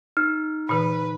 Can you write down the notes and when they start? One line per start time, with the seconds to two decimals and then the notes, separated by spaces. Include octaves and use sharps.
0.17 D#4 F6
0.69 A#2 D3 E3 B4